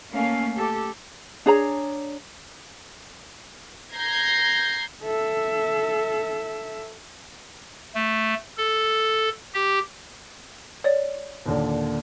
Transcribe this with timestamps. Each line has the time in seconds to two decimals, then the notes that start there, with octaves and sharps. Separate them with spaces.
0.12 A3 A#3 C#4 F5
0.56 G4 A4
1.46 D4 G#4 C#5 A#5
3.95 A#5 G6 G#6 A#6 C7
5.03 A4 E5
7.95 A3
8.57 A4
9.54 G4
10.84 C#5 D5
11.46 D#2 A#2 D3